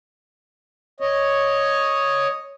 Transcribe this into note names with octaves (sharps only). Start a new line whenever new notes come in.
C#5 D#5